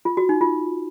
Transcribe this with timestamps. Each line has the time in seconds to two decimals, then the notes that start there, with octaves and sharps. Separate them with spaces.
0.05 F4
0.17 F#4
0.29 D#4
0.41 F4